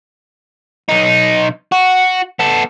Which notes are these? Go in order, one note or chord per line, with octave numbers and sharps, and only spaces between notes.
B1 D#4
F#4
B3 A4